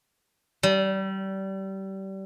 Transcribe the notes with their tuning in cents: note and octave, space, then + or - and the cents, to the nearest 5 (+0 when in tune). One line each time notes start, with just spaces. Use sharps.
G3 -25